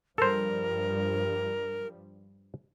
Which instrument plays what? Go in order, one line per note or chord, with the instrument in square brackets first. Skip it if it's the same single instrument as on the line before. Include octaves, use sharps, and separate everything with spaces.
[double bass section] G2 F3 G3 [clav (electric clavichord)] A4 C5 [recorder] A#4